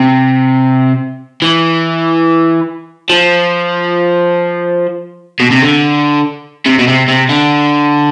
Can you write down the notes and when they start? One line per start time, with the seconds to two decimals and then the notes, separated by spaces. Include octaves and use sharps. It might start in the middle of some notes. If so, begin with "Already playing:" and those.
Already playing: C3
1.42 E3
3.10 F3
5.40 B2
5.51 C3
5.62 D3
6.66 C3
6.79 B2
6.88 C3
7.08 C3
7.29 D3